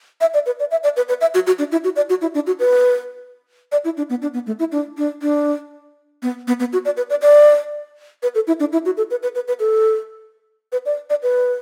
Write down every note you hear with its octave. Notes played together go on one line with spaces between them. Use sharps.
E5
D5
B4
D5
E5
D5
B4
B4
E5
F#4
F#4
D4
E4
F#4
D5
F#4
E4
D4
F#4
B4
D5
E4
D4
B3
D4
B3
A3
E4
D4
D4
D4
B3
B3
B3
F#4
D5
B4
D5
D5
B4
A4
E4
D4
E4
F#4
A4
B4
B4
B4
B4
A4
B4
D5
D5
B4